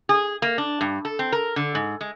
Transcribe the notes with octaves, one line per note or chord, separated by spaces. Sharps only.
G#4
A#3
D4
G2
A4
C4
A#4
D3
G#2
G#3